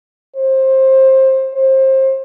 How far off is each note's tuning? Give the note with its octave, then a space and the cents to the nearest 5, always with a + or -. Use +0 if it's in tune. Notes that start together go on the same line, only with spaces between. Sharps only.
C5 +20
C5 +25